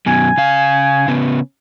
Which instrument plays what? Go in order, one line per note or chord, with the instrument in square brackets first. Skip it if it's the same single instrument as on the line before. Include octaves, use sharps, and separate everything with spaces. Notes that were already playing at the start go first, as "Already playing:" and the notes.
[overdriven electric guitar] F#2 B2 [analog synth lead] G#5
[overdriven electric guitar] C#3 F5
C#3 B3